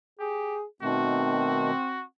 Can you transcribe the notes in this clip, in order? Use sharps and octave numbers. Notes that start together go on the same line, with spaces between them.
G4 G#4
B2 D#3 A3 C4 F#4